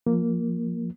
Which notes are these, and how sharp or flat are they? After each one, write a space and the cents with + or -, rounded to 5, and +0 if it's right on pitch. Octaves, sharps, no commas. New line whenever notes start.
F3 +0 A#3 +0